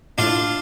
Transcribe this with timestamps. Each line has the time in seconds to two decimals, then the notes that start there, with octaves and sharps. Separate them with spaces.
0.18 A2 D4 F4